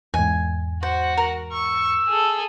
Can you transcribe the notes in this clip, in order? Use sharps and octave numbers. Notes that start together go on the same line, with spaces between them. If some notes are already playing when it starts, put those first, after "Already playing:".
E2 G#2 G#5
F#4 C5 F#5
A#4
C#6 E6
G#4 A4